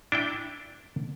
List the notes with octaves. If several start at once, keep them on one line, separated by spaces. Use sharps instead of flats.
D4 E4 G5